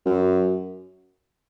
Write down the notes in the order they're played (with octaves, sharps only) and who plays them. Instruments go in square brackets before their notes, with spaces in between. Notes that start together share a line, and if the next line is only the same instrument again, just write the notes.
[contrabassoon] F#2